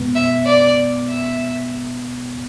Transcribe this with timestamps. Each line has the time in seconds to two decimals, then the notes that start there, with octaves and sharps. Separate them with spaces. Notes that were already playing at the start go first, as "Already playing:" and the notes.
Already playing: B2 G#3 B3
0.15 E5
0.47 D5
1.09 E5